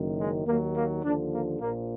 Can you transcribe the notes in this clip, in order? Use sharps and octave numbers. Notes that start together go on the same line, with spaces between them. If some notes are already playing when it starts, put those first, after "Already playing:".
Already playing: F#1 F#2 D#3
G#3
D#2 D#3 F#3 A#3
A#3
D#2 D3 F3 D4
A#3
A#1 A#2 F3 A#3